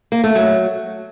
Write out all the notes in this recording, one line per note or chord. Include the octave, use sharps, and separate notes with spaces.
A#3
A3
F#3